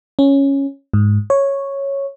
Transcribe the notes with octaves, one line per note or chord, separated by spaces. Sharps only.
C#4
G#2
C#5